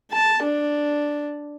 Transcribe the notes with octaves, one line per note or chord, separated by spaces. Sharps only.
A5
D4